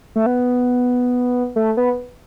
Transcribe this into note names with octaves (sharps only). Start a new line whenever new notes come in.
A3
B3
A3
B3